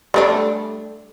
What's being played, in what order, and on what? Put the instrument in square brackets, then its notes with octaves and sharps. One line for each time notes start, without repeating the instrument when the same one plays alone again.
[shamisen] G3 A3 D4